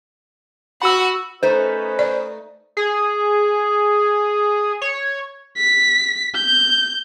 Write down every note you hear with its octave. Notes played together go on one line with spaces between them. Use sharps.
F#4 F#5 B5 E6
A3 C#4 D#4 B4 C5 D#5
D5
G#4
C#5
B6
G6